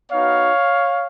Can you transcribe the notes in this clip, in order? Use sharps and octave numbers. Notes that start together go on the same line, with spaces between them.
B3 D#4 F#4 C#5 F5